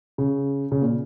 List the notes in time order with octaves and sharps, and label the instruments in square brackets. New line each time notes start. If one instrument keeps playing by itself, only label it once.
[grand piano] C#3
C#3
A#2